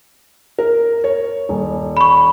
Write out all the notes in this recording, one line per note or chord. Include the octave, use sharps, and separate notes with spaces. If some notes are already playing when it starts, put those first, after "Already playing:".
A#4
C#5
D#1
B5 C#6